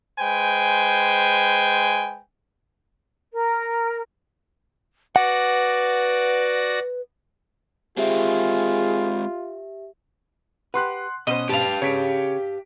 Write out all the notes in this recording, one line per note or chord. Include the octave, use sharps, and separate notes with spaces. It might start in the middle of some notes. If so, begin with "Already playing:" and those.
G#3 B4 C5 G5 G#5
A#4
F#4 B4 D5 F#5 A#6
G#3 C4 F4 G4 G#4 E5
G4 B4 F#5 C6 F#6
B2 C#4 C5 D#5 D#6 E7
G4 B4 F5 A5
C#3 C#5 B6 D7